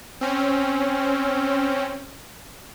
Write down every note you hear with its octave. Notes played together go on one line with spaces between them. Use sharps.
C4 C#4